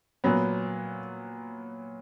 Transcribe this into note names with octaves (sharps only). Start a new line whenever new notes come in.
A#2 F#3 B3